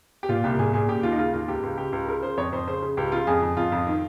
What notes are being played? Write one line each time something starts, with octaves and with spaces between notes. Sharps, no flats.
G4
A#2 F4
C2 G4
A#2 G#4
A#2 G#4
C#3 G4
D#2 F4
D#4
C#3 F4
D#2 F4
C#2 G4
C#2
C#3 G4
C#2
C#3 A#4
C#3 C5
F2 C#5
F2 C5
C#3 C5
C#3
C#2 G4
C#3 F4
F2 G#4
F2
F2 F4
F2
D#3